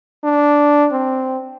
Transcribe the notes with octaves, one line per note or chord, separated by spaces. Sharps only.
D4
C4